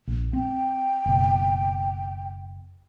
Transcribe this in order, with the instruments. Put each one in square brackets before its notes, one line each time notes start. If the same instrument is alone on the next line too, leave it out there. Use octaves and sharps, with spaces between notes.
[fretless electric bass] A#1
[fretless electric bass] C4 [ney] G5
[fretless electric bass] F#1 B2